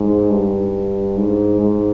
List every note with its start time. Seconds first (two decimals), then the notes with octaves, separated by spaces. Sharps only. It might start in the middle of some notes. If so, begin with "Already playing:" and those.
Already playing: G#2
0.30 G2
1.17 G#2
1.61 G#2